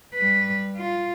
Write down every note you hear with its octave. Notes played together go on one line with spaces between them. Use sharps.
G3 B4
F4